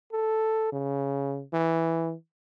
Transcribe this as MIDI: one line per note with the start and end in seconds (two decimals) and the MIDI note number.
0.13 0.68 69
0.73 1.43 49
1.53 2.14 52